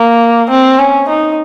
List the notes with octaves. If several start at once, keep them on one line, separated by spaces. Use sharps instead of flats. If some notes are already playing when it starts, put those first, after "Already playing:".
Already playing: A#3
C4
C#4
D#4